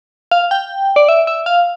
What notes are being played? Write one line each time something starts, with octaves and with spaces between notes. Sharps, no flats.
F5
G5
D5
E5
E5
F5